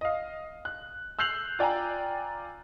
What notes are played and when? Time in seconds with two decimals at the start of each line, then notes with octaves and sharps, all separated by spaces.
0.01 D#5 F5
0.65 F#6
1.19 E6 F#6 G6 C7 F7 F#7
1.59 F4 D5 G5 G#5 A#5